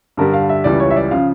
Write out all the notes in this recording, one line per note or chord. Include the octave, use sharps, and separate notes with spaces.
G2 D3 G3 A#4
F5
E5
C#2 C#3 E3 G3 D5
C#5
E5
D5
C#3 F3 F5